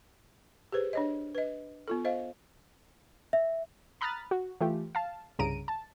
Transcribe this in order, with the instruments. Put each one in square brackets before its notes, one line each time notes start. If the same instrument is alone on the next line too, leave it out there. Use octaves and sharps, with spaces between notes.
[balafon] G4 G#4 B4 C5
D4 C#5 D#5
B4 D#5
B3 F4 A4
C5 D#5 F5
[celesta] E5
[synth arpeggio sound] A#5 B5 D#6 F6 F#6 A6
F#4
E3 A3 F4 G4
F5 A5
C2 G2 C#3 A#5 D7 D#7
A5